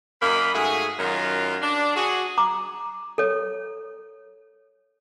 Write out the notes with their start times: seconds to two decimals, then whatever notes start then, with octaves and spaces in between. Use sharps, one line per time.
0.22 F#2 A#3 A#4 D#5 B5
0.55 G#2 A3 F#4 G#4
0.99 F#2 D#3 F#3 F4 A#4
1.62 D4
1.96 F#4 G#4
2.38 A#5 D6
3.18 A4 C#5